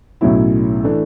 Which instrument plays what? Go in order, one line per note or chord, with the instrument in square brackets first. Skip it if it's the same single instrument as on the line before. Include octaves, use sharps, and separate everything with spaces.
[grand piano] B1 A2 F#3 C#4 E4
E3 A3 D4